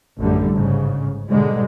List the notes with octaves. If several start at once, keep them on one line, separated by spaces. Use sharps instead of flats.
A1 F#2 D3 G3
G#2 C#3
G#2 B2 D3 G3 G#3